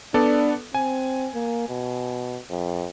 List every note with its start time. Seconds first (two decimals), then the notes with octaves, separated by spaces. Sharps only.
0.14 B3 D4 A4 D5
0.74 C4 G#5
1.34 A#3
1.69 B2
2.50 F2